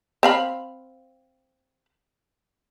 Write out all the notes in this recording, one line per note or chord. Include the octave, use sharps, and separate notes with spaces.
C4 F5 B5